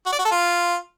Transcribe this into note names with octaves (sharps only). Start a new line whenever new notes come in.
F#4
D5
F#4
A4
F4